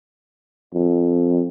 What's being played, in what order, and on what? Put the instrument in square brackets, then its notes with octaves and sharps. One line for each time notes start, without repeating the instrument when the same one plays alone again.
[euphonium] F2